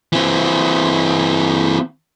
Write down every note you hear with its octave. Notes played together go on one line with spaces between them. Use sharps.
E3 C4